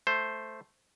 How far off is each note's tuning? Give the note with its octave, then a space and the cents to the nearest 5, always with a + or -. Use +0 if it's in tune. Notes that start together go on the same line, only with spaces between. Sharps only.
A3 +0 C5 +0